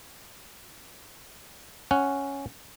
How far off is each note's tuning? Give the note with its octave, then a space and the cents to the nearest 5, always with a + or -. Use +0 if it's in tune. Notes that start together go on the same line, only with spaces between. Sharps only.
C#4 +0 F#5 +0